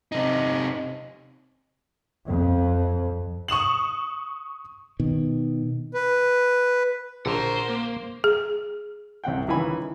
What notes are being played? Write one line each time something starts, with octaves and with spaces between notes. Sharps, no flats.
C3 D#4
F2
C#6 D#6 E7 F#7
B2 D#3
B4
A#1 D3 G4 A#4 C5 F#5 A#5
A#3
G#4
C2 C3 F#5 G5
C#2 D#3 E3 C#4 G#5 B5